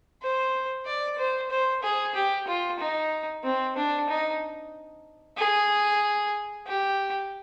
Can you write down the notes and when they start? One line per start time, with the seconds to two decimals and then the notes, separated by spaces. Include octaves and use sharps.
0.22 C5
0.85 D5
1.18 C5
1.50 C5
1.83 G#4
2.15 G4
2.47 F4
2.79 D#4
3.43 C4
3.76 D4
4.09 D#4
5.37 G#4
6.66 G4